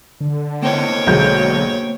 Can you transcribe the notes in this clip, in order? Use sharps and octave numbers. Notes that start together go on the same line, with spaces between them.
D3
A#3 C5 C#5 D#5 G5
B1 D3 G#3 G6